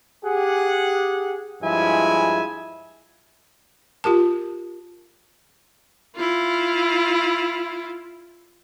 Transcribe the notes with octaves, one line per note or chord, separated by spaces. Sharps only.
G4 G#4 F#5
G2 F3 G#3 E4 E5 G#5
F4 G4 A#4 A5
E4 F4